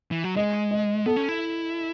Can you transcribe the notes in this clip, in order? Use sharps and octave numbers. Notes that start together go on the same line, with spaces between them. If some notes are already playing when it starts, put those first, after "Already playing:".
E3
F#3
G#3 D#5
D#5
B3 A4
C#4
E4